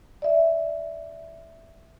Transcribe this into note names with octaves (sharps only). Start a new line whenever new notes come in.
D5 E5